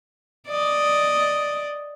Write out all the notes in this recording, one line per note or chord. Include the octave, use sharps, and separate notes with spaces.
D5 D#5